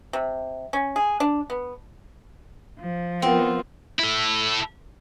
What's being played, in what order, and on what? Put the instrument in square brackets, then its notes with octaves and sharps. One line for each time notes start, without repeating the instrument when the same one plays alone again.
[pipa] C3
C#4
G#4
D4
B3
[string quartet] F3
[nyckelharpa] B3 F4 [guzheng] C4 [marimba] A#4 F#5 G5
[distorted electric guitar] E4 A4